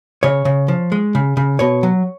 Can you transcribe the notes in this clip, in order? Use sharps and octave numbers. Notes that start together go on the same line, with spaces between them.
C#3 C#5
C#3
F3
G#3
C#3
C#3
B2 C#5
F#3